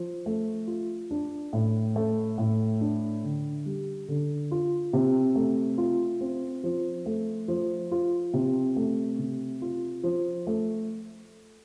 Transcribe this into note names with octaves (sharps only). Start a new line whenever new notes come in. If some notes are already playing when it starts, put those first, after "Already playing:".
Already playing: F3
A3
F4
D4
A2
A3
A2
D4
D3
G3
D3
F4
C3
A3
F4
C4
F3
A3
F3
F4
C3
A3
C3
F4
F3
A3